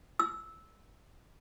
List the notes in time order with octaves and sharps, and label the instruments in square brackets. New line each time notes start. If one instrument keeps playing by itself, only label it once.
[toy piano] E6